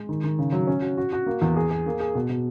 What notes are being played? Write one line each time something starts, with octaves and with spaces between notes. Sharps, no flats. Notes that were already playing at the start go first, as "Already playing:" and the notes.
Already playing: G#3
D#3
D#3
C#3
F#3
C#4
F#4
F#4
F#4
A#3
E2
G#4
G#4
A#3
G#4
B2
B2